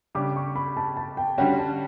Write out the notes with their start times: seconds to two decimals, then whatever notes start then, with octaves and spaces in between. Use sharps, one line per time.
0.15 C#3 G3 D4 G4 D6
0.36 C#6
0.56 B5
0.77 A5
0.97 A5
1.17 G5
1.38 D3 G3 C#4 F#4 G5
1.59 A5